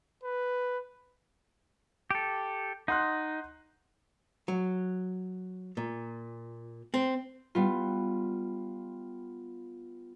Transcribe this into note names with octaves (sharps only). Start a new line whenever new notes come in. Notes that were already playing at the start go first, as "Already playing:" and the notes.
B4
G4 A4
D#4 F#5 C6 F#6
F#3
A#2
C4
G3 B3 F4